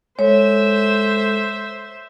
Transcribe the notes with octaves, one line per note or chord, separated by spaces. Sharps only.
G#3 A4 C5 C#5 E5